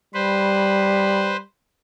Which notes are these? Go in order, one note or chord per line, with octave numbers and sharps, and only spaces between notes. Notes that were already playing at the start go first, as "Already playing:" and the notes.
G3 B4 C5